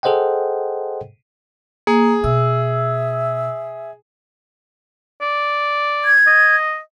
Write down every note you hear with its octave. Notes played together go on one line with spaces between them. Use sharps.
G#4 A4 C5 D#5 F#5 G5
A#3 G#4
B2 E5 E6
D5
G#6
D#5